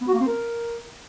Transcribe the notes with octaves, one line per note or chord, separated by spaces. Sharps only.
B3
F#4
A#3
C4
A#4